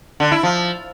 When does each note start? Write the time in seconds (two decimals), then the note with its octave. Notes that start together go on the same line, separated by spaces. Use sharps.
0.20 D3
0.32 E4
0.43 F3